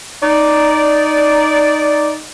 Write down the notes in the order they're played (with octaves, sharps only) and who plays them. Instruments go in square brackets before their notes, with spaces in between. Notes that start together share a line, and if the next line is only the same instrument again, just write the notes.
[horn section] D#4 D5